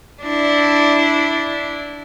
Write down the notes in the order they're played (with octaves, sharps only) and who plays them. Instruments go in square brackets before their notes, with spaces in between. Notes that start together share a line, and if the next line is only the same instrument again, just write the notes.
[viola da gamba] D4 E4